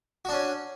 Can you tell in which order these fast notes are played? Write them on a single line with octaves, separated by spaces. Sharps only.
F#4 D4 C#4